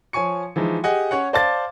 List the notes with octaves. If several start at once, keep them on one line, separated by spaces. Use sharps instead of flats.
F3 C#5 G#5 C#6 C#7
E3 F3 G#3 D#4
G4 G#4 D#5 F#5 G#5
C#4 C#5 F#5
C5 D5 F5 A5 D6 A6